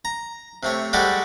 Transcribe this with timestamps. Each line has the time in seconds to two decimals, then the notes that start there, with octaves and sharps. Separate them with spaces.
0.05 A#5
0.63 C3 A3 C#5
0.93 G3 G#3 F#4 G4 A4